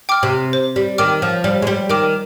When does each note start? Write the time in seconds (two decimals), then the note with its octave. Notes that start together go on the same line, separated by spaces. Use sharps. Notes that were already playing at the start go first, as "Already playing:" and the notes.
0.09 G5 D6 F6
0.23 C3
0.53 C5
0.76 G3
0.98 D#3 G5 D6 F6
1.22 F3
1.44 G3 C5
1.62 G#3
1.67 G3
1.90 D#3 G5 D6 F6